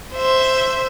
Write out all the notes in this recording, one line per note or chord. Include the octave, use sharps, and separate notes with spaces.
C5 E5